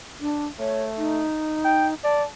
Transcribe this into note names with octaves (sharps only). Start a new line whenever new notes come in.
D4
A3 C#5
D#4
G5
D5 A5